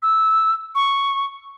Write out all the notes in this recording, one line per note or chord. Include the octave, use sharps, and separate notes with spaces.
E6
C#6